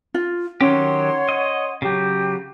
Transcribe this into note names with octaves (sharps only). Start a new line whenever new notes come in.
F4
D#3 F#3 C#4 G4 C#5 F#5 C6
D#5
C#3 F#3 G4